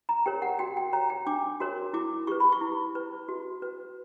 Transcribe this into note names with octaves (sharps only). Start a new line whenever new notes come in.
A#5
G4 A#4 C#5 G5
F#5
F#4 G5
G5
C#5 A#5
G5
D4 D6
F#4 A#4 C#5
E4 D6
G4 B4 C#6
B5
C#6
E4
B4
F#4
B4